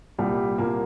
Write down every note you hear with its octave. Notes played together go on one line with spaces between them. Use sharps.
C2 A#2 G3
C2 A#2 A#3